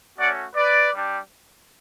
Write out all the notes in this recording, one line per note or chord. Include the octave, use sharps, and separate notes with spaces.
A3 C#4 F#4 D5 F#5
B4 D5
G3 D4 G4